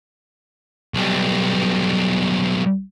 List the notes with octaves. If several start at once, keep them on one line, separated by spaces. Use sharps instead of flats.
B1 G3